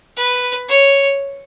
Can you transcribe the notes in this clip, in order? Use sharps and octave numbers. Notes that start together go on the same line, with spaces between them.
B4
C#5